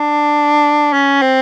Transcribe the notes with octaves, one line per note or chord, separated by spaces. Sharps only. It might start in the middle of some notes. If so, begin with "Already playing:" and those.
Already playing: D4
C#4
C4